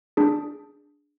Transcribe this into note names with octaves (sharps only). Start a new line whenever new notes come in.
D4 G#4